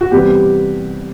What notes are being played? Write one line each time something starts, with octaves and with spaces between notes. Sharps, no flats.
F#4
C3 E3 G3 B3 G4